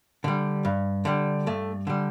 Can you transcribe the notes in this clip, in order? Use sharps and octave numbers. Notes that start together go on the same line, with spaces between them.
D3 G3
G2
D3 G3
G2 A3
D3 G3